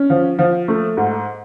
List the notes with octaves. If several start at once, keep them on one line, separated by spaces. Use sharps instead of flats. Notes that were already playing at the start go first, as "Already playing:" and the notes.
Already playing: C#4
F3
F3
A3
G#2